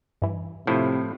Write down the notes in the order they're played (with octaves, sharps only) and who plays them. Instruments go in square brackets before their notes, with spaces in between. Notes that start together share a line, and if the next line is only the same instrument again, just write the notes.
[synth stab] G2 E3
[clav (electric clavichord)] A2 F3 E4 [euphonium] C3